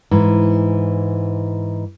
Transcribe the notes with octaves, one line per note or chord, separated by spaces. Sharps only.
G#2 E3